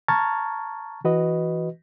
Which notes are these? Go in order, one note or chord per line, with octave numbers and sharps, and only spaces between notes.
A5 A#5 C#6 F6 G#6 A6
E3 F#4 B4 D#5